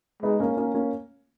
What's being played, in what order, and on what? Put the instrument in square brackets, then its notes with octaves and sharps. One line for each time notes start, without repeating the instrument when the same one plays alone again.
[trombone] G#3 [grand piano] B3 D#4
[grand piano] A#3 C#4
A#3 C#4
A#3 C#4